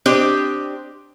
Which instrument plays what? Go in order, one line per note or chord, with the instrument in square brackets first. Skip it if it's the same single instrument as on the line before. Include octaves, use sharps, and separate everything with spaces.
[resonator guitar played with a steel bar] C4 D4 G4 D#5